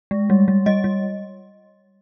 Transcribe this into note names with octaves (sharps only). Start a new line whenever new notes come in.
G#3
G3
G3
G3 D#5
G3